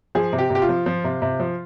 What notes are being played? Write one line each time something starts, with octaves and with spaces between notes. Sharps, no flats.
F3 G#4
C3
G4
C3 G4
F4
F3
F3
C3
C3
F3